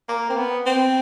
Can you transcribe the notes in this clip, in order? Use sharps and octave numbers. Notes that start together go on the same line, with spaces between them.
A#3
C4
B3
C4